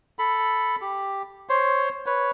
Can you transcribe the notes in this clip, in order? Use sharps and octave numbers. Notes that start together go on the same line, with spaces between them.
A4 B5
G4
C5 C#5 C6
B4 C#5